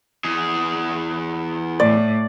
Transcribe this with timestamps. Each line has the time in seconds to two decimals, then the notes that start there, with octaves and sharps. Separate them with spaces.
0.24 E2 G#4
1.80 A2 D5